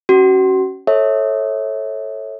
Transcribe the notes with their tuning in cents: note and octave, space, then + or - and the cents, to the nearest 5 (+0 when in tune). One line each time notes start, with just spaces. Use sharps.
C#4 +0 F#4 +35
A4 +0 C#5 -15 E5 -30